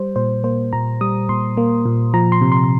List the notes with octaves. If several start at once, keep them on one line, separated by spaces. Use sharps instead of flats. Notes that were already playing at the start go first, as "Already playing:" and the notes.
Already playing: G3 C5
A#2 C5
A#3 C5
A#2 A#5
G3 D#6
A#2 C6
A#3
A#2
F3 A#5
C6
C3
C6